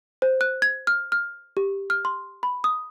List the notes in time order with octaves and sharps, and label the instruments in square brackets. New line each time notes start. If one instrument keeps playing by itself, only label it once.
[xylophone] C5
F#6
G#6
F6
F6
G4
F6
C6
B5
D#6